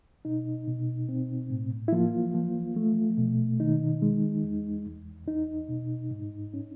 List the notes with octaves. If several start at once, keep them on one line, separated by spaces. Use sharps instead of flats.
B2 D#4
B2
C4
A2
E4
F3 A#3 F4
F3
A3
B2
D#3 D#4
G#3
E2
E2
E2 D#4
B2
G#2
C#4